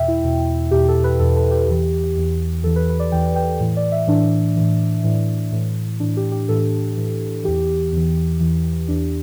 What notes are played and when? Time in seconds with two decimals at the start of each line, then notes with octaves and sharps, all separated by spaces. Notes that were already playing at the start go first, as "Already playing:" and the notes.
Already playing: E2 B2 E5 G5
0.08 E4
0.24 E2 B2
0.71 E2 B2 G4
0.88 A4
1.04 B4
1.20 E2 B2 A4
1.36 A4
1.51 G4
1.68 E2 E3
2.16 E2 E3
2.63 E2 E3 A4
2.76 B4
2.89 B4
3.00 D5
3.12 E2 E3 G5
3.36 G5
3.60 A2 E3
3.77 D5
3.92 E5
4.07 A2 E3 D4
4.56 A2 E3
5.04 A2 E3
5.52 A2 E3
6.00 A2 E3 D4
6.17 G4
6.32 G4
6.49 A2 E3 A4
6.97 A2 E3
7.44 E2 E3 G4
7.92 E2 E3
8.40 E2 E3
8.88 E2 E3 D4